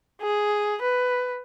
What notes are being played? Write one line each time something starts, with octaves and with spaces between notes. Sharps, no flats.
G#4
B4